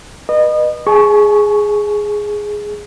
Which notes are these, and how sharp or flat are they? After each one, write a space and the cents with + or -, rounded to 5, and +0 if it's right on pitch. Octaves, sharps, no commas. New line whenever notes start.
B4 -20 D#5 -30
G#4 +0 A5 -45 C#6 +0